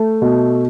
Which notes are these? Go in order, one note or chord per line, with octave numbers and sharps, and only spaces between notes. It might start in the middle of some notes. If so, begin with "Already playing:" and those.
Already playing: A3
B2